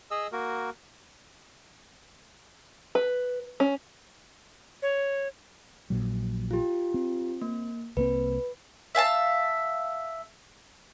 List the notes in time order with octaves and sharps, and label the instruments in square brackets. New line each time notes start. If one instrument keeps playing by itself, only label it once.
[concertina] G#4 D#5 E6
A#3 F#4 A#4
[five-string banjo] B4
C#4
[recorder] C#5
[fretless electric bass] A#1 A#2 F#3
[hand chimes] F4 G4
[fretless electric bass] C4
[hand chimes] A#3
[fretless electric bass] C2 A#3 C4 [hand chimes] B4
[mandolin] E5 F5 G#5 A5